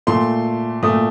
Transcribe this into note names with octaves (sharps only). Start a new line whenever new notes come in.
A#2 A3 C6
A#2 A3 D#6